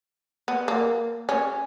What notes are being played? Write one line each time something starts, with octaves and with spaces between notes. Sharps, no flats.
B3
A#3
C#4